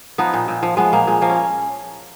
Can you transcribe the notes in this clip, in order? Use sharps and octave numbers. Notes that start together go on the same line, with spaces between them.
F3 B3 D#4
A#2
A#2
F3
F3 G#3 B3
A#2 A#3
A#2 G#3
F3 A#3
C#4